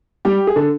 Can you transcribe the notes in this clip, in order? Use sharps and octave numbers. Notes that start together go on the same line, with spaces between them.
G3 G4
G#4
D3 A4